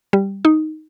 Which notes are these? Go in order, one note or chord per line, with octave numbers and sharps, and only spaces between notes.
G3
D#4